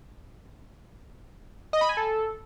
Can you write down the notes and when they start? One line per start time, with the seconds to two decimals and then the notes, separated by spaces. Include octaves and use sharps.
1.73 D#5
1.81 B5
1.89 G#5
1.97 A4